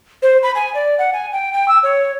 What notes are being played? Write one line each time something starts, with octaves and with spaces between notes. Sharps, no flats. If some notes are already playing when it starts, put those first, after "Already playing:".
C5
B5
G#5
D5
F#5
G#5
G5
G5
E6
C#5